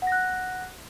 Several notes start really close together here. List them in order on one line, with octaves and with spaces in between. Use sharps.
F#5 A#6 F#6